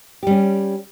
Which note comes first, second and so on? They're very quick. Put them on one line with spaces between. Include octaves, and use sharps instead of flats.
G4 G3 C#4